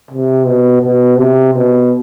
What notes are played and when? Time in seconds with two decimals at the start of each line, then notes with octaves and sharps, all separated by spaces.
0.11 C3
0.46 B2
0.82 B2
1.18 C3
1.54 B2